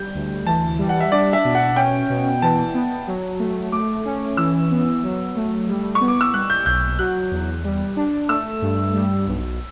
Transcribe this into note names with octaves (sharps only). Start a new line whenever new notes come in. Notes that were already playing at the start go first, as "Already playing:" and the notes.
Already playing: G3 G6
D2
E3 A5
G3
F#5
E5
D4 D5
E5
B2
F#5
C#4 G5
B2
E3 A5
B3
F#3
A3
A3 D6
C#4
E3 E6
B3
F#3
A3
G3
C#6
B3
D6
E6
G3 F#6
G6
B1 G6
F#3 F#6
E2
G3
D4
A3 E6
G2
G3
B1